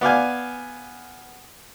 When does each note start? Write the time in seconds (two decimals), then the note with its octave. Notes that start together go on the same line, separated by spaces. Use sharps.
0.01 B3 D5 F5 G#5